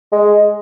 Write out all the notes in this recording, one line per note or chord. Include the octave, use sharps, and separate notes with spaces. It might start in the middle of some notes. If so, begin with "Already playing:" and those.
G#3